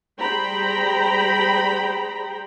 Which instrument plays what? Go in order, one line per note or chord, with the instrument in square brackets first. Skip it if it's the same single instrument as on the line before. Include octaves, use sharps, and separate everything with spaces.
[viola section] G3 G#4 C5 G5 A#5 B5